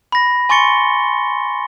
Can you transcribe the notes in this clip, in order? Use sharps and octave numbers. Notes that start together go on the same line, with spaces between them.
B5 A#6
G#5 C6 C#6 A6 C#7 G7